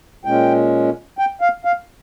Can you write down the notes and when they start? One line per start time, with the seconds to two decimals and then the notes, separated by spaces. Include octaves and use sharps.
0.25 A#2 G#3 C#4 G5
1.18 G5
1.41 F5
1.65 F5